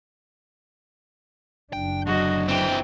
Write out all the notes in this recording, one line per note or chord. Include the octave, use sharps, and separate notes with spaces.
F#1 D4 G5
D3 F#3 F#4 D#5
E3 C4 G5